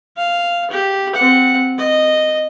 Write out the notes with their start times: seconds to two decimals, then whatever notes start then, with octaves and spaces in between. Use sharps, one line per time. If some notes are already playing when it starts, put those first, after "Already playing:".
0.16 F5
0.70 G4
1.15 C4 F#5
1.78 D#5